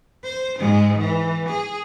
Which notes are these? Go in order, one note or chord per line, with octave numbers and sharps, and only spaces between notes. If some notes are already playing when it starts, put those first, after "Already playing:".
C5
G#2 G#3
E3
G#4